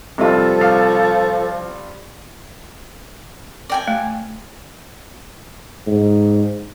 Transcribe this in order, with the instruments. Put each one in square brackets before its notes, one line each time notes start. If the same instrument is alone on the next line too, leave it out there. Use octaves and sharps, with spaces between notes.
[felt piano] G2 C4 F4 [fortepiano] C3 [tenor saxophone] F3 [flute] A4
[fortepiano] C2 F5
[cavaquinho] D5 G5 G#5
[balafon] A3
[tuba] G#2